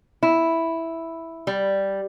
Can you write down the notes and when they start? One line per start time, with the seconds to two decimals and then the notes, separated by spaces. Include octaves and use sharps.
0.23 E4
1.47 G3